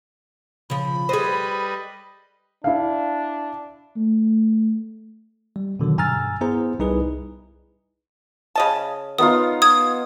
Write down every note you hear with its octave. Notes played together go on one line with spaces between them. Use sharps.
C#3 F3 B5
G3 G#4 B4 C5 D#5
D4 E4 F5
A3
G3
B2 D3 D#3 F#3
G2 G#5 A#5 E6 F6 A6
B3 E4 G#4 C5 A#5
C2 G3 D#4 E4 G#4 B4
C#3 D#5 A5
B3 D#4 F4 D#6
D#6 G#6